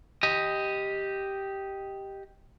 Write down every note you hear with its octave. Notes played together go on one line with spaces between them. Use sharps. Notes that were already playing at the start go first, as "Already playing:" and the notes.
G4 D#5